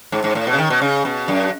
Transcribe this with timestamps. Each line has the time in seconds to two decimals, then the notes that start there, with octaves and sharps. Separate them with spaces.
0.12 G#2
0.24 G#2
0.35 A2
0.47 B2
0.53 C#3
0.58 D#3
0.70 B2
0.81 C#3
1.05 B2
1.28 F#2